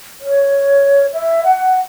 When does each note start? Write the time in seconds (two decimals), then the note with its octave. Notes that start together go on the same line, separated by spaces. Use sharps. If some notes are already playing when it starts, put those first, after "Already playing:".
0.21 C#5
1.13 E5
1.44 F#5